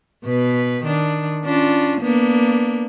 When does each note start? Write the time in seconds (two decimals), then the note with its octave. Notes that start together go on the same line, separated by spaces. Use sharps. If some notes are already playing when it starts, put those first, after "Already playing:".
0.25 B2 B4
0.84 D#3 D4
1.46 C#4 D4 F4
2.01 A#3 B3 D4